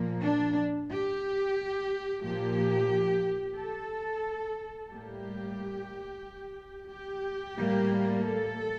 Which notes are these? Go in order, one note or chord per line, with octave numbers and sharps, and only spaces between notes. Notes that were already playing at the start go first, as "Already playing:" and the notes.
Already playing: A#2 F3 A#3
D4
G4
A#2 F3 A#3 G4
A4
A2 G3 A#3 G4
G4
A2 G3 A#3
A4